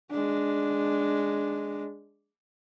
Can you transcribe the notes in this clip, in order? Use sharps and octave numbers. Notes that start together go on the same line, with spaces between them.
G#3 D4